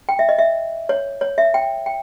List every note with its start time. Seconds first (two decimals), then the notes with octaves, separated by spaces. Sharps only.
0.09 G5
0.19 E5
0.29 D#5
0.39 E5
0.89 C#5
1.21 C#5
1.38 E5
1.54 G5
1.86 G5